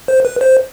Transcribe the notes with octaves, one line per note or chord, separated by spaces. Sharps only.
C5
B4
C5